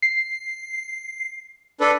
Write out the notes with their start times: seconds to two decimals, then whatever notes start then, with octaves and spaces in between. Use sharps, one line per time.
0.02 C7
1.81 D4 A4 B4